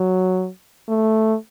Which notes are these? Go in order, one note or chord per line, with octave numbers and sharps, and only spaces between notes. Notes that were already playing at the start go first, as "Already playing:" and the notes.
Already playing: F#3
A3